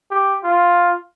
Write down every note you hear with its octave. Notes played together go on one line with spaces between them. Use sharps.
G4
F4